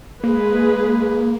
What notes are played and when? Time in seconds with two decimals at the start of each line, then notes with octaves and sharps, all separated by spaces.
0.24 G#3 A#3 G#4 B4